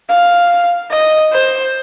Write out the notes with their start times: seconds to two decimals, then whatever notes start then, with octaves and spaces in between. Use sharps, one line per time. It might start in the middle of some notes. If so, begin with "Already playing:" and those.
0.10 F5
0.91 D#5
1.33 C5